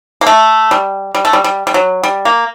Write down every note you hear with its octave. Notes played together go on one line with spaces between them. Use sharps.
A#3
A3
G3
G3
A3
G3
G3
G3
F#3
G3
A#3